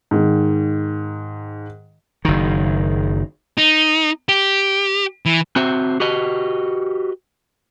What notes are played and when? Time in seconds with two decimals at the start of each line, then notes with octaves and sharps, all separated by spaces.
0.11 G#2 D#3
2.25 F#1 D#3
3.58 D#4
4.29 G4
5.26 E3
5.56 C4 F#4 C5 E5
6.00 F#4 G4 B4 D#5